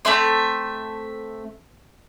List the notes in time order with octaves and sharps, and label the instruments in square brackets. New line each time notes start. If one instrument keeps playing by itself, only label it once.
[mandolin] A3 C4 E5 C6